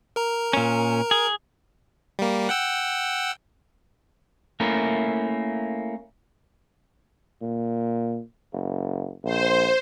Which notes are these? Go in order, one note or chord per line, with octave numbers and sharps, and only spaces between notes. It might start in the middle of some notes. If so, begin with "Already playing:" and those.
A#4 A#5
A#2 C#4
G#4
G3 A#3
F#5 G5 E6
A3 A#3 C#4 E4 A#4
A#2
F#1
A#1 C5